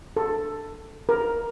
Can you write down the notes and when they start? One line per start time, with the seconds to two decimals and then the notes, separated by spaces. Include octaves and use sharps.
0.16 A4
1.09 A#4